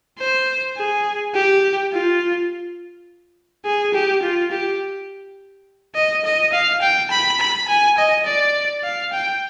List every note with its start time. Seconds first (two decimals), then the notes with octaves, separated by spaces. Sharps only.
0.19 C5
0.77 G#4
1.34 G4
1.93 F4
3.65 G#4
3.94 G4
4.22 F4
4.51 G4
5.95 D#5
6.25 D#5
6.53 F5
6.82 G5
7.11 B5
7.40 B5
7.68 G#5
7.98 D#5
8.26 D5
8.84 F5
9.13 G5